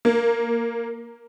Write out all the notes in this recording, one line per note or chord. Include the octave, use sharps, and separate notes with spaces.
A#3